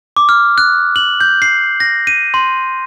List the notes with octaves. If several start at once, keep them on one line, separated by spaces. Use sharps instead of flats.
D6
F6
F#6
F#7
G6
C7
A#6
D#7
C6